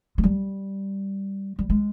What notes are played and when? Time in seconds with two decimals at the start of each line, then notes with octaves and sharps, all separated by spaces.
0.18 G#3
0.24 G3
1.59 G3
1.70 G#3